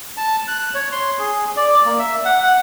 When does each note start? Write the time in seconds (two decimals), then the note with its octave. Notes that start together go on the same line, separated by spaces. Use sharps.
0.17 A5
0.48 F#6
0.74 C#5
0.92 C6
1.19 G#4
1.57 D5
1.85 A#3
1.99 E5
2.25 F#5
2.43 F#5